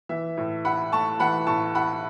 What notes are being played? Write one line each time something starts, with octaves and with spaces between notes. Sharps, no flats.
E3 E5
A2
E4 F#5 B5
A3 A5 C#6
E3 F#5 B5
A2 A5 C#6
E4 F#5 B5